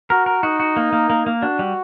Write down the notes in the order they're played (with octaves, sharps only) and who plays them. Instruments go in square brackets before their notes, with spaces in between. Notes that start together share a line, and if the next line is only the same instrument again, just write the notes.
[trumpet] F#4 [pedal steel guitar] A#4
[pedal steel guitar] A#4
[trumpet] D#4 [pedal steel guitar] F#4
[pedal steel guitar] F#4
A#3
A#3
A#3
A#3
[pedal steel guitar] D4 [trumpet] F#4
[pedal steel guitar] G3